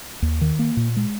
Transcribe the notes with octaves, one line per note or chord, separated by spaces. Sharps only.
D#2
D#3
A#3
A#2
G#3